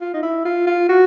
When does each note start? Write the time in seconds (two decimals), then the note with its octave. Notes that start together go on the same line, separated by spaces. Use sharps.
0.01 F4
0.14 D#4
0.23 E4
0.45 F4
0.67 F4
0.89 F#4